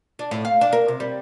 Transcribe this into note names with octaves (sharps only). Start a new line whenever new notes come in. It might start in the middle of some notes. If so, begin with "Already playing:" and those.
D4
A2
F5
D4
A#4
C3
G3